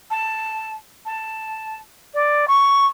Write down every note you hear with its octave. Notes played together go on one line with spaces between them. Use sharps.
A5
A5
D5
C#6